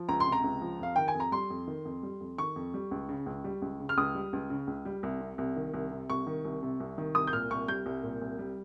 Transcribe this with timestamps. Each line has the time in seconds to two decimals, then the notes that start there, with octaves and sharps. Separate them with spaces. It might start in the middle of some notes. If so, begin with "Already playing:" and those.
Already playing: F3
0.08 C#2 A#5
0.20 C6
0.27 C3
0.32 A#5
0.44 C#2
0.61 F3
0.79 F2 F5
0.96 D#3 G5
1.08 G#5
1.15 F2
1.20 A#5
1.32 G3 C6
1.50 F2
1.67 D#3
1.85 F2
2.03 G3
2.20 F2
2.38 D#3 C#6
2.56 F2
2.74 G3
2.91 C#2
3.09 C#3
3.26 C#2
3.44 G3
3.62 C#2
3.80 C#3
3.89 F6
3.97 C#2 D#6
4.15 G3
4.33 C#2
4.50 C#3
4.67 C#2
4.85 G3
5.03 C2
5.21 C3
5.38 C2
5.56 D#3
5.74 C2
5.91 C3
6.09 C2 C#6
6.27 D#3
6.45 C2
6.63 C3
6.80 C2
6.98 D#3
7.15 C2 D#6
7.27 G6
7.33 A#2 F6
7.50 C2 C#6
7.68 G3 G6
7.86 C2
8.03 A#2
8.21 C2
8.39 G3